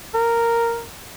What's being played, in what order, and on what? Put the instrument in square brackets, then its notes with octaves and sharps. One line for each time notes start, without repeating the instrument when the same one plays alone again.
[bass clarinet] A#4